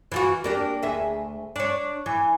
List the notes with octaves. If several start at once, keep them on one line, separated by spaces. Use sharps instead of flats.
E3 F4 F#4
A#3 D4 G4
D2 G#4 E5
D4 C#5
E3